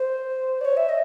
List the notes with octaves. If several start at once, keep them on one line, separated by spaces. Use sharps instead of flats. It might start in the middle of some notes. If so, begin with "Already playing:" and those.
Already playing: C5
D5
C#5
E5
D#5